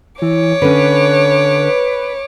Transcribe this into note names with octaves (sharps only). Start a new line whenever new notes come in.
E3 C#5 D6
D3 C#4 B4